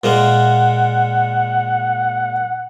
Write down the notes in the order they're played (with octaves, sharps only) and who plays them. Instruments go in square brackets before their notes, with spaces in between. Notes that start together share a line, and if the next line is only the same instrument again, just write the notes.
[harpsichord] A#2 G#3 A#3 [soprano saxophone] F#5